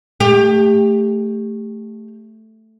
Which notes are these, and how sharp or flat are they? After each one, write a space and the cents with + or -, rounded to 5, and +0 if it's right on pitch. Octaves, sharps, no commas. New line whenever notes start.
A3 +0 G4 +25